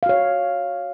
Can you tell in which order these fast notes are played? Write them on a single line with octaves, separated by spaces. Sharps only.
F5 F#4 C#5